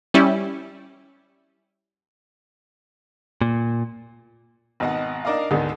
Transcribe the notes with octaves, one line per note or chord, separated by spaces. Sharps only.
G3 C#4 E4
A#2
G#1 B2 D#5 F#5
D4 D#4 A#4 D5 D#5 F5
D2 G#2 B2 D3 D#3